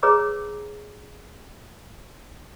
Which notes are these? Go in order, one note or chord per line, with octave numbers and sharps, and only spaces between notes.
G#4 B4 C#5 A#5 D6 E6